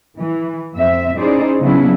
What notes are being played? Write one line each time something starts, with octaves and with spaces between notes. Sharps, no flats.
E3
F2 C4 E5
C#4 D#4 E4 G#4 C5 D5
C#3 F#3 B3 C#4 D4 E4